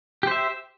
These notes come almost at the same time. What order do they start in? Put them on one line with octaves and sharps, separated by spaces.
G4 C5 E5